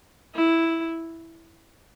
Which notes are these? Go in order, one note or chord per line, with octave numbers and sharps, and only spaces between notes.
E4